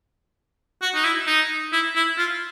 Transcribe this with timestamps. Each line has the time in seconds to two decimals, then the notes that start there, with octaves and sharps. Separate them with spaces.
0.82 F#4
0.95 D#4
1.04 E4
1.27 D#4
1.73 E4
1.95 E4
2.18 F4